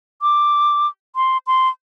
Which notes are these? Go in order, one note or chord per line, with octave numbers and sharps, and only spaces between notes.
D6
C6
C6